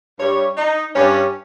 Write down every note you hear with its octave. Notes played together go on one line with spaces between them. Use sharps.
G2 G3 C#5
D#4
G2 G3 C#4